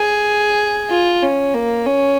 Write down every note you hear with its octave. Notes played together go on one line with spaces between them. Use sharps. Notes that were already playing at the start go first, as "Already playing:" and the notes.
Already playing: G#4
F4
C#4
A#3
C#4